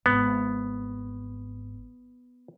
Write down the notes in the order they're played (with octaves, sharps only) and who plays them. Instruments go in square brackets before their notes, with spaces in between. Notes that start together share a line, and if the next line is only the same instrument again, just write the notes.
[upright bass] G#1 [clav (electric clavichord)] B3